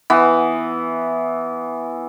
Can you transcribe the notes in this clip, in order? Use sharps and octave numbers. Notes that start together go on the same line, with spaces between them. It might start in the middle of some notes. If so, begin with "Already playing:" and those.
E3 B3